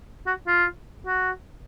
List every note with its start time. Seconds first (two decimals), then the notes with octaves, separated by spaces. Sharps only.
0.27 F#4
0.47 F4
1.07 F#4